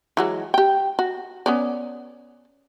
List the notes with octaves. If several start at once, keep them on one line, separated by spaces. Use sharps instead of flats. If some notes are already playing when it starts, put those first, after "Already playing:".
E3 F#3 G#3
G4 G5
F#4
B3 C#4 D5